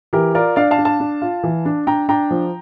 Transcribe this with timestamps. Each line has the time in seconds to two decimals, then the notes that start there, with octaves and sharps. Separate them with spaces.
0.13 E3 G4 A#4
0.35 F4 A#4 D5
0.56 D4 D5 F5
0.71 F5 A5
0.78 D4
0.85 F5 A5
1.00 D4
1.22 F4
1.43 E3
1.65 D4
1.87 D4 G5 A#5
2.09 D4 G5 A#5
2.31 F3